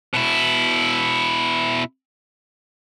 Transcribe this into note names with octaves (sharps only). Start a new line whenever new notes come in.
B2 E4